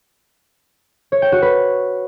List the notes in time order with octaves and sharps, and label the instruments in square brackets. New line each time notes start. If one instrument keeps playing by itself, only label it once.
[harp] C#5
G5
F#4
B4